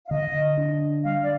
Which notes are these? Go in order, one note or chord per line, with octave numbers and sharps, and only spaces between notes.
F5
D3 D#5
D4
G3 F5
D5